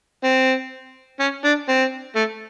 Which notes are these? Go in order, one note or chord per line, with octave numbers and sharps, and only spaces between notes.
C4
C#4
D4
C4
A3